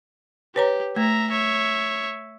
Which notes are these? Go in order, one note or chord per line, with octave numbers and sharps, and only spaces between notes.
G4 B4 C#5 A#5
A3 E5 A#5
C#5 E5